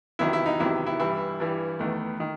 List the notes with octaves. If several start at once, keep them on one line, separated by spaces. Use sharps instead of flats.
E2 C3 D#3 F#3 E4
E4
D#4
E2 C3 D#3 F#3 E4
E4
G2 E3 G3 E4
G2 E3 G3
E2 D#3 A3
D#3